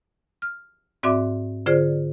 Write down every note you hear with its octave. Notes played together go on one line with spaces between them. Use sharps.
F6
G#2 C4 F#4 D5 E5 D6
D3 F4 G#4 C5 D5